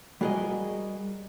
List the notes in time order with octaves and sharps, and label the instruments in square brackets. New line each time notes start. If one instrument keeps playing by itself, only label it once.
[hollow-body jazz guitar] G3 F#4 G#4 A#4 D#5